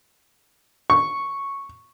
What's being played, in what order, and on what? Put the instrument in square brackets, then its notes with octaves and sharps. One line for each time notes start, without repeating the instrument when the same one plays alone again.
[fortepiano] C#6